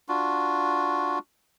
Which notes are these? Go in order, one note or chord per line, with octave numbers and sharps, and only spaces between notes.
D4 F4 F#4